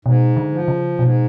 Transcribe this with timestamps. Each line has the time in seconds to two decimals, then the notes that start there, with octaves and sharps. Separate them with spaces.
0.05 G#2 B2
0.37 D3
0.52 F3
0.68 C#3
0.99 G#2 B2